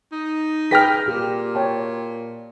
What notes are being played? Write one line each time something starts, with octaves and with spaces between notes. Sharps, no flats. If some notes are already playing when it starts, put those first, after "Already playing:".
D#4
G#4 B4 G5 F6 A#6 B6
A#2 G4
C#5 G5 A5